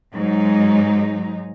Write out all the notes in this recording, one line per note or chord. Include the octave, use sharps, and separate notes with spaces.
G#2 F#3 G#3 D#4